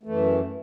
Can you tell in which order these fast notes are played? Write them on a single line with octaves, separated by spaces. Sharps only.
A3 E3 F#2